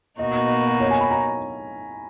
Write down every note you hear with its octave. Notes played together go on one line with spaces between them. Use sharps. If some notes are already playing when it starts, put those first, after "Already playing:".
B2 A#3 D#4 F#4 D#5
C#5
G#5
B5
A#5